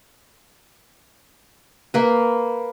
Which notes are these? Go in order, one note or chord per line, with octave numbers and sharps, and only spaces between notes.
A#3 B4